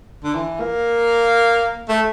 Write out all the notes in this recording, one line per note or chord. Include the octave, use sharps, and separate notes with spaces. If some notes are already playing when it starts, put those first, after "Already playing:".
D3
E3
A#3
A3